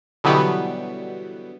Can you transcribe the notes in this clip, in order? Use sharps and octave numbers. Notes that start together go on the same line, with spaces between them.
B2 D3 E3 F#3 G3 B3